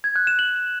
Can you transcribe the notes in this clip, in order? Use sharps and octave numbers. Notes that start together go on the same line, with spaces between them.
G#6
F#6
E7
F#7